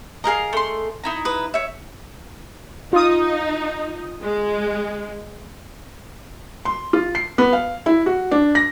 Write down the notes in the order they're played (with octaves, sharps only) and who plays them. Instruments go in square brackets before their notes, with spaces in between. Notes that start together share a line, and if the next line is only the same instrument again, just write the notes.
[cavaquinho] G#4 A#4 D#5 [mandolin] F5 A#5
[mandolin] A3 C6
D#4 E4 A#5
[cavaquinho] B4 D#6
C#5 E5
[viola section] D#4 [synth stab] F4 D#6
[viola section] G#3
[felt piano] C6
F4
C7
B3
F5
E4
F#4
D4
A#6